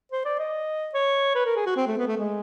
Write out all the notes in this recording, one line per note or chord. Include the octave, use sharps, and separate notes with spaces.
C5
D5
D#5
C#5
B4
A#4
G#4
F#4
C4
A3
B3
A3
G#3